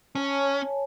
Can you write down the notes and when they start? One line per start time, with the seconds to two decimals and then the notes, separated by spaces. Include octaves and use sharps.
0.15 C#4 C#5 G#5 A5